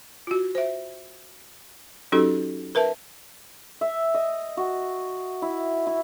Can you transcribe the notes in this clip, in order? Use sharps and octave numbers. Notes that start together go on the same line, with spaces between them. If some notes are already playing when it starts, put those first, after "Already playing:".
F4 F#4
C5 E5
F#3 C#4 D#4 F#4 G4 A4
A#4 B4 E5 A5
E5
D#5
F#4
E4
E4